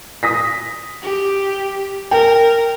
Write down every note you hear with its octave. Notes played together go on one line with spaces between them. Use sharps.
D#6 A#6 B6
G4
A#4 G5